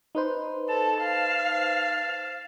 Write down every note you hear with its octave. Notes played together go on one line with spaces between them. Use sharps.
D#4 B4 C5
A4 A5
F5